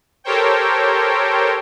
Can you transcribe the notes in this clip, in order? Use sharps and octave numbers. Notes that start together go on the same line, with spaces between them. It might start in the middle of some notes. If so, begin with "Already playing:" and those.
G4 A4 A#4 C5 C#5 G5